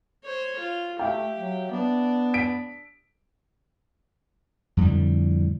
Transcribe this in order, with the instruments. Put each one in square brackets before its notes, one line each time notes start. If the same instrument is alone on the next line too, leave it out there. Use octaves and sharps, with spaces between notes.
[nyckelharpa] C5 C#5
F4
[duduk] A3 [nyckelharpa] G4 [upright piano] E5 F5 G5
[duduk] F#3
[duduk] B3 [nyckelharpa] D4
[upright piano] B6 D7
[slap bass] F2 A2 D3 G3